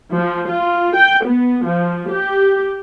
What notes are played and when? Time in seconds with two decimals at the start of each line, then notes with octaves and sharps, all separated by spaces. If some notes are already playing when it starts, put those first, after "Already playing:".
0.15 F3
0.51 F4
0.95 G5
1.26 B3
1.65 F3
2.09 G4